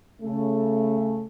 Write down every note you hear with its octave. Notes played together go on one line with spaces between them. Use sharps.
C#3 A3